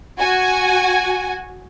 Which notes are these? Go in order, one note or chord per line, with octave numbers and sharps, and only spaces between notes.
F#4 G#5